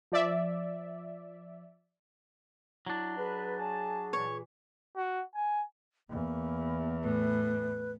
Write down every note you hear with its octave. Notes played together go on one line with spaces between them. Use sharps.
F3 D5 E5
F#3 D4 E4
G#4 B4
C#5 G#5 A5
A#2 E3 C#5
F#4
G#5
E2 A#3
A2 B4